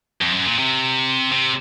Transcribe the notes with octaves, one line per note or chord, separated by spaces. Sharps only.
F2
F#2
A#2
C3
C3